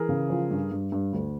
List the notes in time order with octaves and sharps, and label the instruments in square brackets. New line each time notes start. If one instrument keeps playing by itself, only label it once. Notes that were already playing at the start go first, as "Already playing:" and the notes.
Already playing: [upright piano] E3 G#4 A#4
C#3
F3
G2
G2
G2
D2